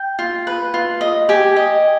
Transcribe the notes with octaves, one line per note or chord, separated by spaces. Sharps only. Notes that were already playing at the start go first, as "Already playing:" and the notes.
Already playing: G5
F4
B4
F4
D#5
G4 G#5
D#5